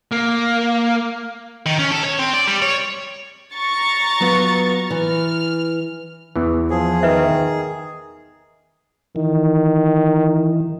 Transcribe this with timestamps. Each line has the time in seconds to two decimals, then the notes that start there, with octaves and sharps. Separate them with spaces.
0.12 A#3
1.66 D#3
1.78 C#4
1.91 A4
2.04 C#5
2.19 C4
2.34 D5
2.47 G3
2.62 C#5
3.55 A#5 C#6 A6
4.20 F#3 B3 F4
4.91 E3 F6
6.36 E2 E3
6.70 F3 G#4
7.03 D#3 B4 E5
9.16 D#3 E3